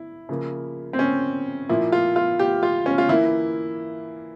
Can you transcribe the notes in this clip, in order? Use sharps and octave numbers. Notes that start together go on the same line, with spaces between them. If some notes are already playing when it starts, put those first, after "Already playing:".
Already playing: E4
C#3 F3 A#3
C4
C#4
A#2 F3 A#3 E4
F4
F4
G4
F4
C#4
F4
E3 A#3 E4